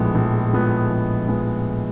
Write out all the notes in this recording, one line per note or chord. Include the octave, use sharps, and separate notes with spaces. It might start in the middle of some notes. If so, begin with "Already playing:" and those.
Already playing: A#1 A2 F3 G#3 B3
A#1
A2 F3 G#3 B3
A#1
A2 F3 G#3 B3